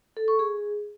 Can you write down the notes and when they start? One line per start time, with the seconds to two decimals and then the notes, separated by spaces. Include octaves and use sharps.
0.17 A4
0.28 C#6
0.39 G#4